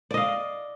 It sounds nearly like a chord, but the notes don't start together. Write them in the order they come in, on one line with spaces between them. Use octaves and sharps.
D5 D#5 F5